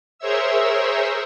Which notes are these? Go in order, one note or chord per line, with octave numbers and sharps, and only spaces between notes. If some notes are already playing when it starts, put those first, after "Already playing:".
G#4 A#4 C5 C#5 E5 E6